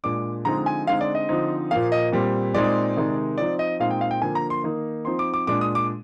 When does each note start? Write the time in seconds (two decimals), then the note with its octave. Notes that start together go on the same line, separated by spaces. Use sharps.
0.04 A#2 G#3 D4 D6
0.45 D3 F3 G#3 C4 D#4 A#5
0.66 G#5
0.87 D3 G#3 C4 D#4 F5
1.01 D5
1.15 D#5
1.29 D3 F3 C4 D#4
1.71 A#2 F3 A#3 F5
1.92 D#5
2.12 A#2 G3 C4
2.54 A#2 G#3 C4 D#4 D5
2.96 C3 D#3 G#3 D#4
3.38 F3 C4 D#4 D5
3.59 D#5
3.80 A#2 G#3 C4 D#4 F5
3.91 G5
4.01 F5
4.11 G5
4.21 D3 F3 A#3 G#5
4.35 A#5
4.50 C6
4.64 D#3 A#3 D#4
5.05 F3 C4 D#4 C6
5.19 D6
5.34 D6
5.47 A#2 G#3 D4 D6
5.61 D#6
5.75 D6